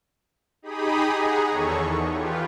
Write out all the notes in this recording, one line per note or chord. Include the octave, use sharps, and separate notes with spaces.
D#4 G4 G#4 B5 D#6
G#4 F#5 A#5
E2 D#3 A4 C#5 C#6
E2
F4 G4 B4